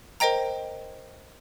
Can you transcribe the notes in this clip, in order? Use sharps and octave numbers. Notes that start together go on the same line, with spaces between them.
A#4 C5 D#5 G5 A#5